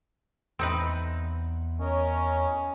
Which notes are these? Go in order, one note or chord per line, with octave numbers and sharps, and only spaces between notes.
E2 C4 D#4 B4
C#4 A#4 C#5 D#5